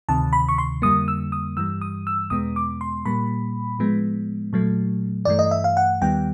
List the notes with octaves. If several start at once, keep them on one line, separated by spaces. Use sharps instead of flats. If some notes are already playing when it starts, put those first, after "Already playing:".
D2 C3 D#3 A5
B5
C#6
C6
F2 D3 G3 A#3 D#6
E6
D#6
G2 E3 G3 E6
D#6
E6
E2 B2 G#3 B3 D#6
D6
C6
A#2 G3 A#3 B5
A2 F3 G#3 B3
A#2 F#3 A3
G2 E3 A3 D5
D#5
E5
F5
F#5
D#2 D#3 G3 B3 G5